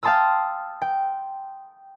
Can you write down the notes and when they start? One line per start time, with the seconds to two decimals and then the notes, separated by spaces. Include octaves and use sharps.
0.03 F5 G5 A5 C6 D#6 E6
0.82 G5